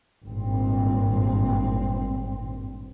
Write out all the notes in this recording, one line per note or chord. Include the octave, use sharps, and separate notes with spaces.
G#1 G2 A#2 C4